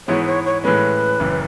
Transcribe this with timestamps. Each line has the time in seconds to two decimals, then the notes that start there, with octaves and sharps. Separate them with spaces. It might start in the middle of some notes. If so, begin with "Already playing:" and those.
0.08 G#2 E3 G#3 B3 E4 C#5
0.26 C#5
0.45 C#5
0.63 A2 E3 G#3 C#4 B4
1.20 F#1 F#2 E3